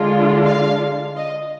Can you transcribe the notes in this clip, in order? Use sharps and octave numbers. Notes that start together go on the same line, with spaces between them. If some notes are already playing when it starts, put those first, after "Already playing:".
Already playing: D3 G#3 D4 F4
F5
D#5